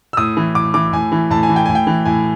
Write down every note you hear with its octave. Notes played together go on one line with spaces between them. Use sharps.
E6
A2 D#6
E3
A2 D6
E3 D6
A2 G#5
E3
A2 A5
G#5
E3
G5
A2 G#5
G5
E3
A2 G#5